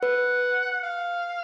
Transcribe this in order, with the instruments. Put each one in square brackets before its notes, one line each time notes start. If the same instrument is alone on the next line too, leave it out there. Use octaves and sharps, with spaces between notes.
[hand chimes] B4 [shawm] F#5
[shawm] F5